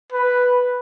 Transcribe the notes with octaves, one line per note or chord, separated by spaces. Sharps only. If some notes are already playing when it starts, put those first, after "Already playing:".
B4